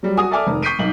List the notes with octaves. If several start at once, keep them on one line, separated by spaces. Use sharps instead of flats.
F#3 G3
F#4 G#5 D#6
A4 D5 E5 G#5 D6 F6
F1 D#3
C#6 G6 B6 C7 D7 D#7
B1 D#4 F#7